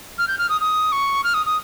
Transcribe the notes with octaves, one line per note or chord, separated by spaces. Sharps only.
F6
G6
F6
D#6
D#6
C#6
F6
D#6
D#6